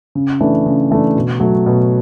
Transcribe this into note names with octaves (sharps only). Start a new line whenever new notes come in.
C#3
E3 A3 D4
C#3
E3 A3 D4
B2
F#3 A3
B2